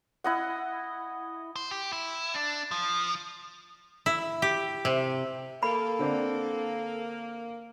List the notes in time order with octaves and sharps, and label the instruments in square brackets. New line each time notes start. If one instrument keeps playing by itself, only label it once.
[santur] E4 D#5 F#5
[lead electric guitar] C5
G4
E4
D4
F3
[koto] E4
G4
C3
[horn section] A#3 [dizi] A4 [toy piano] B5
[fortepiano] D3 C4 D4